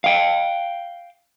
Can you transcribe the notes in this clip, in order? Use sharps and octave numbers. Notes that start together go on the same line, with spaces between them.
F5 G5